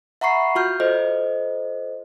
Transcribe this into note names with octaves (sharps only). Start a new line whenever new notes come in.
E5 F#5 A#5 B5 C#6 C7
F4 F#4 F6 G6
F4 A4 C5 D#5